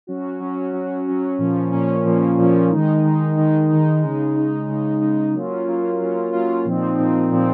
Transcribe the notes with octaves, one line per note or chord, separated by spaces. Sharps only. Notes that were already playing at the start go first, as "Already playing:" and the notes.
F#3 C#4 F#4
F#3 C#4 F#4
F#3 C#4 F#4
F#3 C#4 F#4
A#2 F3 A#3 C#4
A#2 F3 A#3 C#4
A#2 F3 A#3 C#4
A#2 F3 A#3 C#4
D#3 G#3 D#4
D#3 G#3 D#4
D#3 G#3 D#4
D#3 G#3 D#4
C#3 G#3 D#4
C#3 G#3 D#4
C#3 G#3 D#4
C#3 G#3 D#4
F#3 A#3 C#4 F4
F#3 A#3 C#4 F4
F#3 A#3 C#4 F4
F#3 A#3 C#4 F4
A#2 F3 C4 D#4
A#2 F3 C4 D#4
A#2 F3 C4 D#4